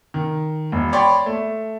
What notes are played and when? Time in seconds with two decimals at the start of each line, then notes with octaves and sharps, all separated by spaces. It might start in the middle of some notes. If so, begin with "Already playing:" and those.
0.14 D#3
0.72 E1
0.93 C#5 D5 G5 B5 C6
1.26 A3